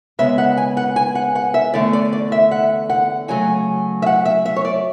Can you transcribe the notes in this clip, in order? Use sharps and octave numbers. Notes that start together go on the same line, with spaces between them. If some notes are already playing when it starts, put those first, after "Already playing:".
C#3 G#3 B3 E5
F#5
G#5
F#5
G#5
F#5
F#5
E5
E2 D3 A3 D5
D5
D5
E5
F#5
F#5
C#3 F#3 A3 G#5
E5
F#5
E5
E5
C#5
D5